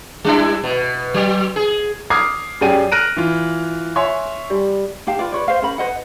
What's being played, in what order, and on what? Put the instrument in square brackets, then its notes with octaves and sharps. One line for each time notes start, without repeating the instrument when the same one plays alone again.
[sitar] G3 D4 E4
B2
F#3
G#4
[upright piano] D6 D#6 F6 G#6 C7
F#2 G4 G#4 D5 G5 D#7
F6 F#6 A#6 D7 D#7
E3 F4
C#5 E5 G#5 C6
G3
[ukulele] D#4 G4 F5 A5
F4 B4 D5
B4 C#5 D5
C5 F5
C#4 A#4 B5
B4 C5 D#5 F#5